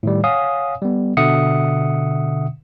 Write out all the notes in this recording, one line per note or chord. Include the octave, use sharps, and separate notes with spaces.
A2 D#3 G3
C#5 F5 F#5 G#5 D#6
G3 B3
B2 D3 E5 F#5 D#6 C#7